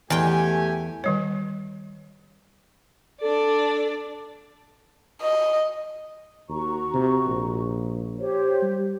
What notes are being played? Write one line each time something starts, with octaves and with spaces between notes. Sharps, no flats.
E2 A3 G4 G5 G#5
D#3 G3 C#5
D4 A4 D5
D#5
D#2 F#4 A#5 C#6
C3
A#1
G4 C5 C#5
G3